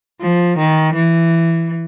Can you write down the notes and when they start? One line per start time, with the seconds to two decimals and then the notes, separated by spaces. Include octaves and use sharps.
0.22 F3
0.58 D#3
0.95 E3